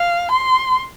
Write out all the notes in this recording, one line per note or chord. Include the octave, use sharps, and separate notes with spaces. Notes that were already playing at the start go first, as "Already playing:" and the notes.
Already playing: F5
C6